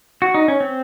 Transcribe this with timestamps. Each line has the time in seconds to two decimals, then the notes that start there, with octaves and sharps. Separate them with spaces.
0.22 F#4
0.34 D#4
0.48 C#4
0.60 C4